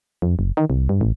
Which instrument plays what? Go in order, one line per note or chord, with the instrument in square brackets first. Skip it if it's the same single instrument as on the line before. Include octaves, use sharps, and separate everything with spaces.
[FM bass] F2
F#1
D#3
C2
G2
A1